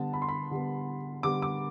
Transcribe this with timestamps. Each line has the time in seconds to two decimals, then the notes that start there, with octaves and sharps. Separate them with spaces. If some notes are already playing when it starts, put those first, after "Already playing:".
Already playing: D3 G3 B3 A5
0.13 B5
0.22 C6
0.28 B5
0.51 D3 G3 B3
1.23 D3 G3 B3 D6
1.42 D6